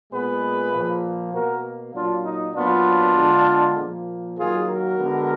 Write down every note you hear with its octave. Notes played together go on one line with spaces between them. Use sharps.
A#2 G#3 B3 G#4 B4
A#2 F3 A#3
B2 A#3 F#4 A#4
A#2 F#3 A#3 D4 F4
D#4
A#2 F#3 B3 D4 F4
D3 G#3 B3
A#2 F3 A#3
D#3 F#3 A#3 F4 G#4
F#4 A#4
D3 G#3 B3